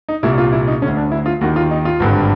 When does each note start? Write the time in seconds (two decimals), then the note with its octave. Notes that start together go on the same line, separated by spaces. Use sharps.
0.08 D#4
0.23 C2 A#2 E4
0.38 F4
0.53 E4
0.68 D#4
0.82 D2 D3 C#4
0.97 D4
1.12 E4
1.26 F4
1.41 D#2 D#3 F#4
1.56 F4
1.71 D#4
1.85 F4
2.00 G#1 G2 D3